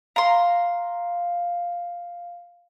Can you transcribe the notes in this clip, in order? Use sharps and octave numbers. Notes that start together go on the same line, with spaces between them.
F5 A#5 C6